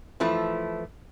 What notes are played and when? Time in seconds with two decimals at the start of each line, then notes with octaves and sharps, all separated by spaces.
0.20 E3 F3 A3 E4